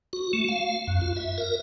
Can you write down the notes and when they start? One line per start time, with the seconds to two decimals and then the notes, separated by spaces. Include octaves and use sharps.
0.13 F#4
0.33 A3
0.48 F5
0.87 F#2
1.01 F4
1.16 E5
1.38 A#4